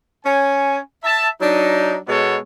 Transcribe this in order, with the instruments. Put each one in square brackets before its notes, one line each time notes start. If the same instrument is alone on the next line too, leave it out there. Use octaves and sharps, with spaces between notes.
[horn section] C#4 G#5
E5 A5
F#3 D4 D#4
B2 G#3 B3 A4 C#5